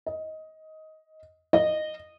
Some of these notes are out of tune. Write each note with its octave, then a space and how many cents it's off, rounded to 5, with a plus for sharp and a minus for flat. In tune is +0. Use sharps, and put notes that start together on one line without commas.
D#5 +15
D#5 -15